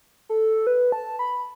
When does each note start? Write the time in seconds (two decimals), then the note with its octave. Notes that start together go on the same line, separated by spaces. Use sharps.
0.29 A4
0.67 B4
0.92 A5
1.19 B5